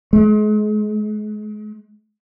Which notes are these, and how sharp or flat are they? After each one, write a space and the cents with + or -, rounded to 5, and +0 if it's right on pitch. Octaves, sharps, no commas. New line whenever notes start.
G#3 +35